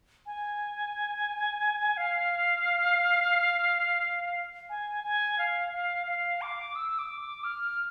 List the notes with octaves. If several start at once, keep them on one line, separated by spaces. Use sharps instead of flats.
G#5
F5
G#5
G#5
F5
F5
F5
D6
E6
D6
D6
F6